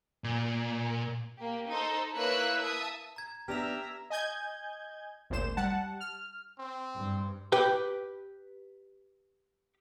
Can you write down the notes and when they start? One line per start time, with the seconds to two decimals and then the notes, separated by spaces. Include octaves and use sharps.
0.24 A#2
1.37 A#3 G4
1.68 D#4 A4 C5
2.14 A#3 E4 B4 C#5 E6 F#6
2.60 E5 A5 D#6
3.16 A#5 G#6
3.48 B3 D4 G4 E5 A#5 F6 F7
4.10 D#5 G#5 G6 G#6
5.30 G#1 D2 A#2 C5 E7
5.57 G3 F#5 A5
6.00 F6
6.59 C4
6.96 G2
7.52 G4 B4 G5